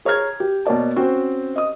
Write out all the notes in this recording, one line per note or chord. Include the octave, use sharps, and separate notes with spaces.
G#4 C#5 A#5 F6 G#6
G4
B2 A#3 C#5 D5 A5
C4 C#4 F#4 C5 G5
D#5 D#6